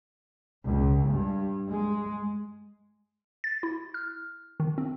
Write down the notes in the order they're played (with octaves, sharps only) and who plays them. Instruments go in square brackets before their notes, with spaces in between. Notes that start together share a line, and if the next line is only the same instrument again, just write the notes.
[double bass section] C#2
G2
G#3
[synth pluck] A6
E4
F6
D#3
C4